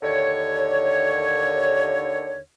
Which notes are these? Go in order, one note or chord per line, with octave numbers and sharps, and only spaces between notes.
D#2 D3 C#5